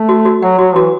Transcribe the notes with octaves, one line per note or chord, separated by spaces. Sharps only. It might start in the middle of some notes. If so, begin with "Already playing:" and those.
Already playing: A3
F#4
F#4
F#3 F#5
F#3 F#4
E3 F#4